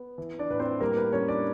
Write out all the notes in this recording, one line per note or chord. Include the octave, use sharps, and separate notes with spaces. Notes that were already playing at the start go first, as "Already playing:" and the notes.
Already playing: B3
E3
D4 D5
A2 B4
C4 C5
G3 A#3 A#4
B3 B4
G3 C#4 C#5
D4 D5